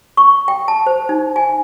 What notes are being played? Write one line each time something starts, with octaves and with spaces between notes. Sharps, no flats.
C#6
G5
A5
C5
D#4
G#5